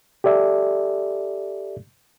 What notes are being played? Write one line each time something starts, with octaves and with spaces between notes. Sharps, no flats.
G4 A4 D5 E5